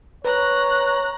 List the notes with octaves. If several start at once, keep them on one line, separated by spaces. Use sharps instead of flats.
B4 C#5 A#5 F#6